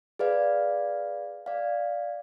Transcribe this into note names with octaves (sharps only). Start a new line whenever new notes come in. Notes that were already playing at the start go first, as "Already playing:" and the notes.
G#4 B4 D5 F5
D5 F5